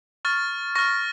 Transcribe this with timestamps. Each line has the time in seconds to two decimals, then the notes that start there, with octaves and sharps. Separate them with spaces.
0.25 C#6 F6 A6
0.75 C#6 F6 A#6